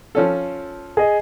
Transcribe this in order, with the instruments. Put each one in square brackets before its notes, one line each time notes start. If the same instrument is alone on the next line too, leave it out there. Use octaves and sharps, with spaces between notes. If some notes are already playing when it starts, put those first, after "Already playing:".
[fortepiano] F3 C#4 A4
[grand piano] G#4 D#5